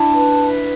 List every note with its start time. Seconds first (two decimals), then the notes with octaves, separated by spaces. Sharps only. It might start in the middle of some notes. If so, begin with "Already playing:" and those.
Already playing: D4 E4 A5
0.14 B4
0.41 E5